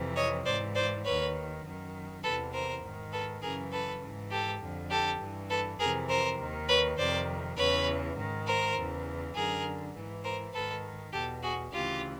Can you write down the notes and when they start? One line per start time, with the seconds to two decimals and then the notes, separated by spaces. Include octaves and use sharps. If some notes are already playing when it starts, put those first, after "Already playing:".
Already playing: F2 C3 E3
0.15 C#5 D#5
0.45 G#2 E3 C5 D5
0.75 C5 D5
1.04 D#2 D#3 B4 C#5
1.64 F#2 D#3
2.23 E2 C3 E3 A4 B4
2.53 A#4 C5
2.82 G#2 D#3
3.12 A4 B4
3.42 F#2 C#3 E3 G#4 A#4
3.72 A4 B4
4.01 G#2 E3
4.31 G4 A4
4.60 F2 D3
4.90 G4 A4
5.20 G2 E3
5.49 A4 B4
5.79 F2 C3 E3 G#4 A#4
6.08 A#4 C5
6.39 D#2 D#3
6.68 B4 C#5
6.97 F2 C3 D#3 C5 D5
7.57 E2 C#3 E3 B4 C#5
8.16 G#2 D#3
8.46 A#4 C5
8.76 E2 C#3 E3
9.34 F#2 D3 G#4 A#4
9.94 G#2 E3
10.24 A#4 C5
10.53 G#2 D#3 A4 B4
11.12 E2 B2 G4 A4
11.42 F#4 G#4
11.72 D2 C#3 E3 F4 G4